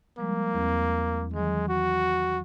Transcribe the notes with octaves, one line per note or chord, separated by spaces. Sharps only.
F3 G3 G#3 A#3
E2 C4
D#3 E3 F#3 G#3
F#4